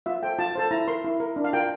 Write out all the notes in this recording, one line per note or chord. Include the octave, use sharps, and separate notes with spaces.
F4 E5
A4 C5 G5
F4 A5
A4 C5 A5
E4 A#5
A#4 C6
E4
A#4
D4
F5
F4 A#4 G5